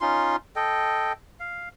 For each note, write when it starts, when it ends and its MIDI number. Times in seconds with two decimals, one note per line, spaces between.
0.01 0.36 61
0.01 0.36 63
0.01 0.36 65
0.01 0.36 84
0.56 1.13 69
0.56 1.13 75
0.56 1.13 79
1.40 1.69 77